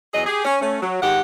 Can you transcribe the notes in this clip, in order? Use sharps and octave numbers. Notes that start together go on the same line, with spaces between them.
E2 F#3 G#4 D#5
G4 G#4
C#4
A3 C#4
F#3
G#2 D#3 G4 F#5